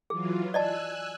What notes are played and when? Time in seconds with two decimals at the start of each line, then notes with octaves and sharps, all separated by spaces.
0.10 E3 F#3 F4 G#4
0.54 D5 D#5 G#5 A5 E6 F#6